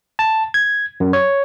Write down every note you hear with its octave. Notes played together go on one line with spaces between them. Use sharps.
A5
G#6
F#2
C#5